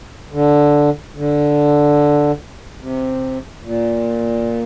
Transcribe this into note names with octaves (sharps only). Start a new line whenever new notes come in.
D3
D3
C3
A#2